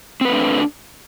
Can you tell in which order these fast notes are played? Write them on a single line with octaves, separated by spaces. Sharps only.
C4 B4 A3 D4